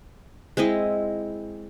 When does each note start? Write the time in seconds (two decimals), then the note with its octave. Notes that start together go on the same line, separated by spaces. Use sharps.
0.57 G#3 C4 E4 D#5